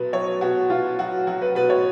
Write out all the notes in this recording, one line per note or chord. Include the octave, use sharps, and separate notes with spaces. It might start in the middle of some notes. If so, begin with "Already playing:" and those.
Already playing: B2 F#3 B4
F#3 C#5
B2 F#4
B2 F4
F#3 F#4
F#3 F#4
B4
B2 B4
C#5